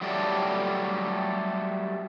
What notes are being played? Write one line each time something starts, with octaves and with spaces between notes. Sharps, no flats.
F#3 G3 A3 A4 D5